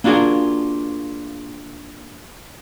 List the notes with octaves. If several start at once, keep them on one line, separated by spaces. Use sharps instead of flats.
A#3 D4 F4 F#4 G#4 A#4